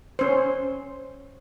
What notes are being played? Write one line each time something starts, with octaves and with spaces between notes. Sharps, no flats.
C#4 C5